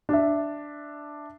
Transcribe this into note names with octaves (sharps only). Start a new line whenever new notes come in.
D4 E5